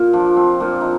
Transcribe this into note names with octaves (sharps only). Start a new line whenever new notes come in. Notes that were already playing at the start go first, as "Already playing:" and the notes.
Already playing: A#2
F3 D4
C4
A#2 D4
D#4